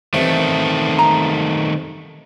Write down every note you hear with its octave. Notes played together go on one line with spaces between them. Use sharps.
G2 C3 D#3 E3 A3
A#5